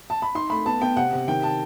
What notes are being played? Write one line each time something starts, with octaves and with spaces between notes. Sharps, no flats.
A5
B5
D#4 C6
A3 B5
B3 A5
B3 G5
C3 F#5
C3
D#3 G5
A5